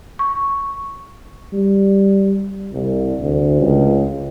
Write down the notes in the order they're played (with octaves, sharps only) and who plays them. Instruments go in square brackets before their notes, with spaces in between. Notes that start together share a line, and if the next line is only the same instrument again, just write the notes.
[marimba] C#6
[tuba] G3
C2
D2
C#2